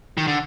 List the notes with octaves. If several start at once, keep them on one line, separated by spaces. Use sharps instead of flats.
D#3
D3